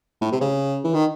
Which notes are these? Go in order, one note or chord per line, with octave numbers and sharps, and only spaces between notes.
A2
C3
C#3
E3
D#3